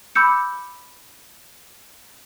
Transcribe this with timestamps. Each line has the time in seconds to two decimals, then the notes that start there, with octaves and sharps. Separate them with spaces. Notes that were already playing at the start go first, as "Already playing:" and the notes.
0.15 B5 D6 E6 G6 C#7